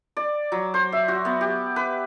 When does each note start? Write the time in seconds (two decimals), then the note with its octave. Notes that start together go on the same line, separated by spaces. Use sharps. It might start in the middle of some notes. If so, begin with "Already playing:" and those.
0.17 D5
0.52 F#3
0.74 C5
0.92 E5
1.08 F#4
1.25 B3
1.41 G4
1.76 B4